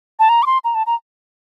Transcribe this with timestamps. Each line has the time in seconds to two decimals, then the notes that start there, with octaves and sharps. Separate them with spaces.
0.19 A5
0.29 A#5
0.43 D6
0.46 C6
0.64 A#5
0.75 A5
0.87 A#5